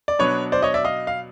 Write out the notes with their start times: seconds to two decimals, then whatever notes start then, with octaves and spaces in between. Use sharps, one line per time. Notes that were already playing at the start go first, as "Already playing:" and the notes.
0.08 D5
0.19 B2 F#3 B3 D4 B4 C#5
0.52 C5 D5
0.62 C#5 D#5
0.74 D5 E5
0.85 D#5 F5
1.07 F5